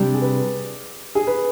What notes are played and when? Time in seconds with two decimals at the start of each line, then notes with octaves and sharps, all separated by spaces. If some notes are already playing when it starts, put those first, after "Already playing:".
Already playing: C3 G3 D4 G4 D5
0.14 G#4
0.22 B4
1.15 G#4
1.27 B4